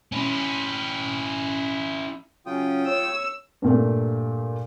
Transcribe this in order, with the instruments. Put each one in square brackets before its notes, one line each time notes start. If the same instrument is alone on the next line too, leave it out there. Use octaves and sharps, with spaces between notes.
[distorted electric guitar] C#4 E4
[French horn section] C#3 F#3 C#4 [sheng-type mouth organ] F4 G5 D#6
[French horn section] C#5 [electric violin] E6
[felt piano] G2 A#2 A3